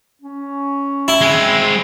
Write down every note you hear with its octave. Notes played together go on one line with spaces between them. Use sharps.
C#4
E4
G#3 C4